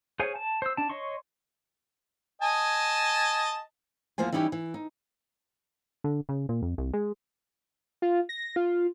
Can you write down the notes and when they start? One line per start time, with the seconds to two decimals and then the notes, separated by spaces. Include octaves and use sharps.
0.20 G#4 C5 C#5 F5 G#5
0.36 A5
0.62 C5 E6
0.77 D4 A5
0.89 C#5 D#5 C6 C#6
2.42 D#5 G#5 A5
4.18 E2 F3 A#3 C5 G#5
4.32 E3 G3 C#4 D#4 E4 G4
4.52 E3
4.74 D#4
6.04 D3
6.29 C#3
6.49 A#2
6.62 F2
6.78 C2
6.94 G#3
8.02 F4
8.29 A#6
8.56 F4